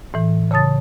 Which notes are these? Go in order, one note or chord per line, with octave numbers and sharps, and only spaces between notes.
A2 E3
C#3 C#5 A5 D#6 A6